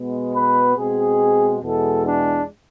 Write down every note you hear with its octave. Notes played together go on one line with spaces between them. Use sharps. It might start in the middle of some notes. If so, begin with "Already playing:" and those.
Already playing: B2 G#3 B3
B4
B2 G#3 C4 G#4
E2 B2 G#3 A4
D4